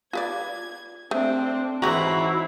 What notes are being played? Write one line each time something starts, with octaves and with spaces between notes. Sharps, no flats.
F4 B4 D5 G#6
A3 C4 D4
G#2 E3 E4 F#4 G#4 B4 A#5